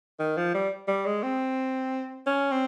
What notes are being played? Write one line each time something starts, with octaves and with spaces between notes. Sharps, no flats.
D#3
F3
G3
G3
G#3
C4
C#4
C4